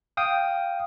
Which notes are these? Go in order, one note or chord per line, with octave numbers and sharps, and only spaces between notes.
F5 G5 D#6